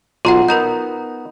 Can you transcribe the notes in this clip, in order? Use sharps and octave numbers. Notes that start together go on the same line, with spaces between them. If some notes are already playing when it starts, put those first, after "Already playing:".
B1 F4 F#5 A#5 C6
B3 D#4 A#4 A#5 G6